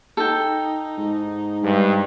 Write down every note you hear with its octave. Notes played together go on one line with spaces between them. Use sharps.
D#4 A4 G5
G#2
G2 G#3